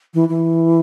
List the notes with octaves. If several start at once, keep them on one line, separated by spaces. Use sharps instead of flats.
E3
E3